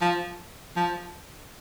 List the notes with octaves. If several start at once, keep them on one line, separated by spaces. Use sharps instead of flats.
F3
F3